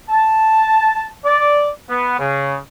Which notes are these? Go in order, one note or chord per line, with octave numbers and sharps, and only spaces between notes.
A5
D5
B3
C#3